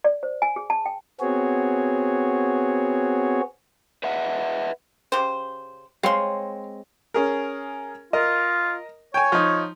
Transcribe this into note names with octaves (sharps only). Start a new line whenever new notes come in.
D5
C5
G#5
G#4
A5
G5
B3 C4 F#4 G#4 C#5
B4 D#5 E5 F#5
C#3 G4 C5
G#3 C4 C#5 F5 C6
C#4 G#4 A#4
F4 A#4 D#5
C#5 G5 G#5
F3 D#4